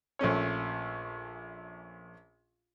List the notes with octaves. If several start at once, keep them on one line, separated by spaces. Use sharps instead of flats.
A#1 A3 C#4 C#5